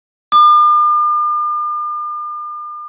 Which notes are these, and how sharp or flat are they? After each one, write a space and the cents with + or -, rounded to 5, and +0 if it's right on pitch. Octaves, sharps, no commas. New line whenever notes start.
D6 +45